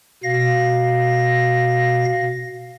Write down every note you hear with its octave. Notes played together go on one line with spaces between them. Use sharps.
B2 F5 A#6